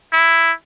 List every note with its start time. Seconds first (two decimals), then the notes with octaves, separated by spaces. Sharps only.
0.13 E4